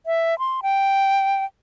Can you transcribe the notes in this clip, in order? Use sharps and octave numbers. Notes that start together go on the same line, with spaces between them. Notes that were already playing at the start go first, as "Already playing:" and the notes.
E5
C6
G5